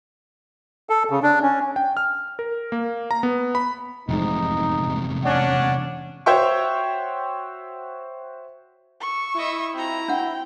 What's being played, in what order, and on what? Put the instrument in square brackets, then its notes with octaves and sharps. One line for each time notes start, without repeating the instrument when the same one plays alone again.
[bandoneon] A4
C#3
D4
C#4
[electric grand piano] G5
F6
A#4
A#3
A#5
B3
B5
[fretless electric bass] F1 G#2 [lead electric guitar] E2 C3 [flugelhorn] D#4
[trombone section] C#4 D4 [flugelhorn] F#5
[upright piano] F#4 C5 C#5 E5 G5 C#6
[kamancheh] C#6 E6
[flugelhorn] E4 [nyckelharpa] D#5 E5
[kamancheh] C4 F4 [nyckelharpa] F#4 A#5
[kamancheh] C4 G5 [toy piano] D4 F#5